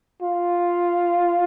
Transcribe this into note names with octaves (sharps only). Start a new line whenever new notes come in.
F4